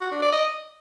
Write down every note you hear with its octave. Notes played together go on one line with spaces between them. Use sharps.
F#4
D4
D5
D#5